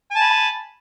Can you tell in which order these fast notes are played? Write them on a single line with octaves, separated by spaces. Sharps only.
G#5 A5 B5